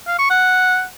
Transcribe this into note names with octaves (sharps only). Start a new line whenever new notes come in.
F5
C#6
F#5